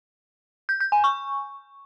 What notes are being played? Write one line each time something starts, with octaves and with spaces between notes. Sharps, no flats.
G6
G6
G#5
C#6